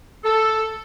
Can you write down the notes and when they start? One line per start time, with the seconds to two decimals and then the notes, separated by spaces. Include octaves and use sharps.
0.24 A4